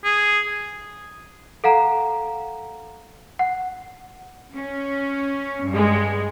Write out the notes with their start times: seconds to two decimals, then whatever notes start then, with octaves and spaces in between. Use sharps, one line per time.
0.04 G#4
1.64 A4 F5 F#5 A#5
3.39 F#5
4.55 C#4
5.69 G2 G#3